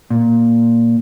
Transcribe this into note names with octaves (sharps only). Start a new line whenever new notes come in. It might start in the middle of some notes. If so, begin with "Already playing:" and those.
A#2